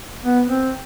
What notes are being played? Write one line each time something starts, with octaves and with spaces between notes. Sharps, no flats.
B3
C4